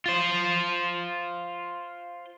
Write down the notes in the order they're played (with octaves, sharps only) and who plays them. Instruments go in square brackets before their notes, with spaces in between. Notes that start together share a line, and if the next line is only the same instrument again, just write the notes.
[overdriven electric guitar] F4 C5